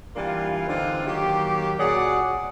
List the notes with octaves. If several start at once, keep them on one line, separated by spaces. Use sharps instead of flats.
E3 G3 A#3 D4 F4
D3 E3 C4 D#4 F4
D#3 F#3 A#3 G4
A#2 F#4 G#4 C#5 D5 F#5